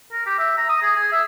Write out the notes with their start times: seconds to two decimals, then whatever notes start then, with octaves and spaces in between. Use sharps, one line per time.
0.12 A#4
0.26 G4
0.39 E5
0.57 A#5
0.69 D#6
0.82 G#4
0.95 G#4
1.12 E5